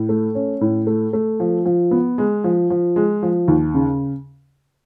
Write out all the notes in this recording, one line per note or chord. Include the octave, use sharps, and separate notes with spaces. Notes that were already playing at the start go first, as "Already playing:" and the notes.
Already playing: A2
A3
C#4
A2
A3
A3
F3
F3
B3
G#3
F3
F3
G#3
F3
D#2
C#3